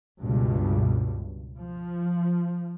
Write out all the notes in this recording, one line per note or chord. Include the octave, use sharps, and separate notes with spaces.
C#2 G2 B2
F3